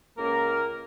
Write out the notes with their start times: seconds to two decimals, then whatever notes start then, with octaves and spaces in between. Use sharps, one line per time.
0.17 C#2 A#3 A#4